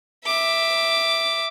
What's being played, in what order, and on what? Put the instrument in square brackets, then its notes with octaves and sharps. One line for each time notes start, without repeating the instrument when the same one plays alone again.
[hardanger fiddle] E5 D6